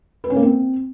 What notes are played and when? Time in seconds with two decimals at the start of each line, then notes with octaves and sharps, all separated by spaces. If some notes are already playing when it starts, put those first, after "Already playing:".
0.24 B4
0.30 C#4
0.36 A#3
0.43 C4